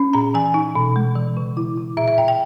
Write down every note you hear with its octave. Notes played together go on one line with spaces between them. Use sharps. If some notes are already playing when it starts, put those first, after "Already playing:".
Already playing: C#4
A#2 A#5
E3 G#5
D#4
B2
G#3
E3
C#3
E4
E4
A#2 E5
E5
A#2 G5
G5